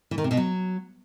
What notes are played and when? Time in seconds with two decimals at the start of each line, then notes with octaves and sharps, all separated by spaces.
0.11 E3
0.18 D#3
0.24 C3
0.31 B2
0.37 F#3